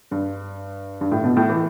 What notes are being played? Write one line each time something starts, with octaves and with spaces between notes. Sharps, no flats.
G2
G2
A2
B2
A2
E3